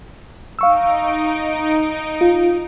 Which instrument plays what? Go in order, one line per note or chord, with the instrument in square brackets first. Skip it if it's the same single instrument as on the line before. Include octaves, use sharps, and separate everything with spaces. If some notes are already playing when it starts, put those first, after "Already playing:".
[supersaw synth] D#4 D7 [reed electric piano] F5 C#6 E6
[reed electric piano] F4